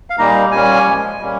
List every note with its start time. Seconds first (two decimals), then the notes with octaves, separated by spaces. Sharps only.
0.10 F5
0.18 A#2 G3 A#3 D#4 A#5
0.51 A#2 G3 A#3 C#4 G#5
0.86 A#2 F3 G#3
1.19 A#2 G3 A#3 C#4